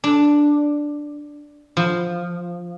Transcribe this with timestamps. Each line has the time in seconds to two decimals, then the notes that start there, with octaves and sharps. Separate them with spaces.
0.04 D4
1.77 F3